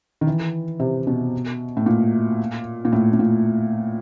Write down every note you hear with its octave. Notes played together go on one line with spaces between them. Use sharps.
D#3
E3
C3
B2
A2
A#2
A#2
A2
A2
A#2